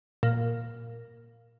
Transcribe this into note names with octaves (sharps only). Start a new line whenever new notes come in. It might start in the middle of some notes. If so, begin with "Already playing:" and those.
A#2